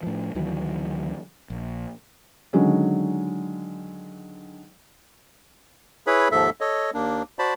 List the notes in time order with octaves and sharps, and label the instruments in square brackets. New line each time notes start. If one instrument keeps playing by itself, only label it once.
[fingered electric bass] A2 F3
D2 D#3 E3 F#3
A#1
[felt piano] D3 D#3 F#3 G#3 C#4
[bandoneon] E4 G#4 B4 C#5 B5
D#2 G#2 F3 A4 E5
A4 C#5 D#5
D#2 A#3 D4
F#4 C5 D5 A5 B5